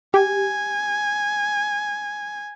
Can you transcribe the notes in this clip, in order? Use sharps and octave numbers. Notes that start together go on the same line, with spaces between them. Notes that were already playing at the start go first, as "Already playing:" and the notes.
G4 G#5